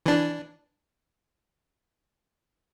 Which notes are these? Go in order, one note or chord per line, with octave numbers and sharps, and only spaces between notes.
E3 D4